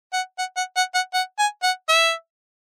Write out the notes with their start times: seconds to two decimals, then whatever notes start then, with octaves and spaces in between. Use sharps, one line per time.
0.13 F#5
0.38 F#5
0.57 F#5
0.77 F#5
0.95 F#5
1.14 F#5
1.39 G#5
1.63 F#5
1.89 E5